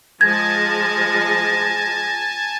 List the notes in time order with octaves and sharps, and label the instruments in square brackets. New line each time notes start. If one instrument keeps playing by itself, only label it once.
[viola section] F3 G#3 [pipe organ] G#5 A5 [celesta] G#6 [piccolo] A#6